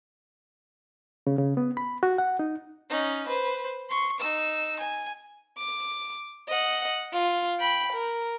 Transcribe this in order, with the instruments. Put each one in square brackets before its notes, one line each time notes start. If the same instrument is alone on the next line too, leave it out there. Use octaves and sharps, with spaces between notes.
[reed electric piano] C#3
C#3
B3
B5
F#4
F#5
D#4
[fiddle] C#4 D#4
B4 C5
C6 C#6
D#4 E6
G#5
[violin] D6
D#5 F#5
F4
G5 B5
A#4